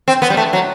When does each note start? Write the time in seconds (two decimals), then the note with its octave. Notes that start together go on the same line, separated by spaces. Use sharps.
0.08 C4
0.22 B3
0.30 G3
0.37 A3
0.53 F#3